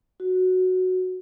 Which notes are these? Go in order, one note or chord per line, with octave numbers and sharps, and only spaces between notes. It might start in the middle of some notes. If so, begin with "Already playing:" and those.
F#4